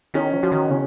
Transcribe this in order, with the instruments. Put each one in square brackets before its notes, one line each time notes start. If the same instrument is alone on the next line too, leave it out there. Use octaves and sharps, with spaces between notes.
[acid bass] D#3 [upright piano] C#4
[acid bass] F3
[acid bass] F3 [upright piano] F#4
[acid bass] D#3
[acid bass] C#3 [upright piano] C#4